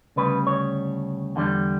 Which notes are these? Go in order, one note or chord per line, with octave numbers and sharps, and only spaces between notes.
D2 C#3 G3 B4
C#5
E2 D3 G3